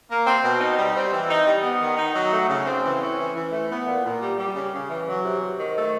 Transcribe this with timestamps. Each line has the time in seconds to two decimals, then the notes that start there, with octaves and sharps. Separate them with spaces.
0.09 A#3
0.26 C4
0.42 B2
0.60 D#4
0.76 G3
0.95 C4
1.12 E3
1.29 D#4
1.46 G3
1.63 B3
1.81 D#3
1.97 D#4
2.14 F#3
2.32 A3
2.48 C#3
2.65 C4
2.84 E3
3.01 C#4
3.18 E3
3.35 E3
3.51 A3
3.69 B3
3.87 A#2
4.04 A#2
4.21 G3
4.38 G3
4.54 C#3
4.72 C#3
4.89 E3
5.07 F#3
5.24 C3
5.40 C3
5.58 D#3
5.76 A3